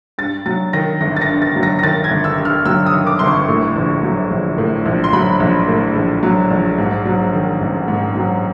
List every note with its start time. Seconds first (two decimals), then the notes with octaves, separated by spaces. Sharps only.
0.18 G2 A6
0.46 F#3 A6
0.73 D#3 A#6
1.01 G1 A#6
1.16 A6
1.21 A#6
1.29 G2
1.42 A6
1.56 F#3
1.63 A#6
1.79 A#6
1.83 D#3 A6
2.04 G#6
2.11 G1
2.24 E6
2.38 G2
2.45 F6
2.66 F#3 E6
2.86 D#6
2.93 D#3
3.07 D6
3.19 G1 C6
3.27 C#6
3.48 A2
3.76 A#1
4.03 F#3
4.30 A#1
4.58 A2
4.86 A#1
5.04 C6
5.13 F#3 B5
5.40 A#1
5.68 A2
5.95 A#1
6.23 F#3
6.51 A#1
6.78 G#2
7.05 F#3
7.33 D#3
7.61 A1
7.88 G#2
8.15 F#3